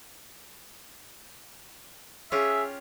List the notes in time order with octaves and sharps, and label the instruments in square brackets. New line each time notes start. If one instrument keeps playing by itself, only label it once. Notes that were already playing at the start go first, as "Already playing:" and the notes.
[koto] C#4 F4 G4 [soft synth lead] G#4 [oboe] E5